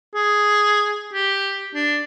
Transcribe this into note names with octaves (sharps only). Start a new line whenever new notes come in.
G#4
G4
D4